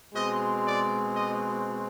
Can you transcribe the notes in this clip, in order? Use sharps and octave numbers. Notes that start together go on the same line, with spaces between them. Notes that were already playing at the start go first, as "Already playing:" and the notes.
B2 G#3 C4 D#5
D5
D#5